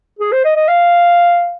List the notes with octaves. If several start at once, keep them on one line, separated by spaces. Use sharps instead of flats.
G#4
C5
D#5
D#5
F5